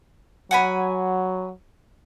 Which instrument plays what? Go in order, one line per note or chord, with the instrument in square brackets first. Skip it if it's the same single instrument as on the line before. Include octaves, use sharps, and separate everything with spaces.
[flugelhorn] F#3 [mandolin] F#5 G#5 B5